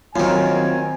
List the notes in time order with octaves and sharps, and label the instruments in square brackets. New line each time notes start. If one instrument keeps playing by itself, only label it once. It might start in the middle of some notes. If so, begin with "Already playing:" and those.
[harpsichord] F#2 D#3 [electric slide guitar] C4 F4 [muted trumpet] G#5